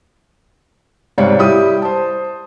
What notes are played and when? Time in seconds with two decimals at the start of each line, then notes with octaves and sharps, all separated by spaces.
1.18 G#2 C3 G3 C#5 D5 F5
1.39 G3 E4 G4 D#6
1.82 C5 A5